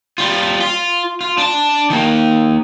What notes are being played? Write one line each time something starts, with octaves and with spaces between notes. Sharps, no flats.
G3 F4
F4
F4
D4 A5
D#3 A#3